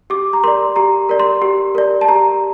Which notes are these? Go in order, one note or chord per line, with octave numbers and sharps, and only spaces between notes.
G4 D6
A#5
A#4 D5 C6
G4 A#5
A#4 D5
C6
G4
A#4 D5
A5
G4 A#5